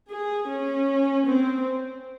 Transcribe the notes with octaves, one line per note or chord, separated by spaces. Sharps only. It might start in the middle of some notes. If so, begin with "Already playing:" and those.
G#4
C#4
C4